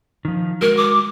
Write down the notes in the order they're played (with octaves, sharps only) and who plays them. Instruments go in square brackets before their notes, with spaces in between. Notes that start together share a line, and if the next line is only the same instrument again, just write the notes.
[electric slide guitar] D#3 F3
[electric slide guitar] G#3 F#4 [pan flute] A#4
[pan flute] D6